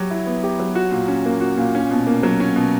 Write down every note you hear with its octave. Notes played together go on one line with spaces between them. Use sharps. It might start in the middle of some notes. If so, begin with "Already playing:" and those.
Already playing: F#3 G4
E4
B3
G4
F#3
F#4
A#2
C#4
A#3
F#4
A#2
C#4
B2
A#3
F#3
C#4
B2